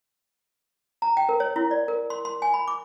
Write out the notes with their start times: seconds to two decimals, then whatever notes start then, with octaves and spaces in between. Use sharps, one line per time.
1.02 A#5
1.17 G5
1.29 A#4
1.40 C#5
1.56 E4
1.71 D5
1.88 A#4
2.10 C6
2.25 C6
2.42 G#5
2.54 B5
2.68 D6